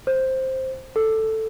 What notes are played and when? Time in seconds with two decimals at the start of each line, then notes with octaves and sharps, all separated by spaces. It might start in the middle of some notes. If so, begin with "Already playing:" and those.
0.07 C5
0.96 A4